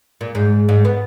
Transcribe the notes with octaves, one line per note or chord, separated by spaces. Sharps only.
A#2
G#2
G#2
B3